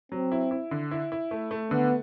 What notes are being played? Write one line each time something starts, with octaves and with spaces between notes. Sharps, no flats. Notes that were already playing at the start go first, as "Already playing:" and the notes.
F#3 C4
E4
E4
D3
E4
E4
A3
A3
D3 B3